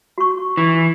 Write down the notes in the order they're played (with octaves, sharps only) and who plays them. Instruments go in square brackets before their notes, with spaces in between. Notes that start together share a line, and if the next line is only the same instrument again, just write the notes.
[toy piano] F#4 C#6
[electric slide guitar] E3